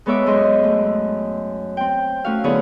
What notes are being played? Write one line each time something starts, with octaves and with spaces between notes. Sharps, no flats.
G#3 B3 A4 C#5 E5 D6
F#2 G#3 D#5 C6
A3
C4 G5
A3 C#4 F#4 F5
D3 F#3 B3 E4 G#4 C#5